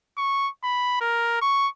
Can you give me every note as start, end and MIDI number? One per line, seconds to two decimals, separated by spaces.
0.17 0.49 85
0.64 0.97 83
1.01 1.39 70
1.41 1.68 85